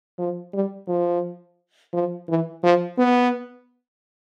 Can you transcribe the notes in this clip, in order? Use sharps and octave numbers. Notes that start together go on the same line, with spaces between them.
F3
G3
F3
F3
E3
F3
B3